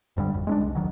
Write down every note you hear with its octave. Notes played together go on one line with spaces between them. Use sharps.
F1 G2 D3 G3
G#1 F2
G#3 C#4 D4
C2
E1 D#3 F#3